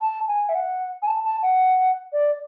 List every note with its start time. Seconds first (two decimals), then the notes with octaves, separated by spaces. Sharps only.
0.01 A5
0.28 G#5
0.49 E5
0.55 F#5
1.02 G#5
1.08 A5
1.24 A5
1.42 F#5
2.13 D5